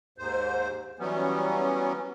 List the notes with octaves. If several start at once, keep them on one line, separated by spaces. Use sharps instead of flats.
D#2 G#2 C5
E3 F#3 G3 B3 C#4